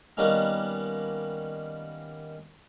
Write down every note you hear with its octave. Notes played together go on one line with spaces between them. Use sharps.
D#3 G3 A#3 B3 C#4 D#4